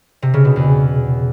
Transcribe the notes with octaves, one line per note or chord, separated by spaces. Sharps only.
C3
C#3
B2
E2